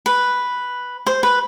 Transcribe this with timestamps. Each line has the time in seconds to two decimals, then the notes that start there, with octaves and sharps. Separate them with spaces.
0.06 B4
1.07 C5
1.23 B4